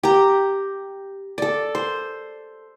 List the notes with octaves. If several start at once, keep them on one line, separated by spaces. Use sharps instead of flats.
G4 A#5
A4 D5
C5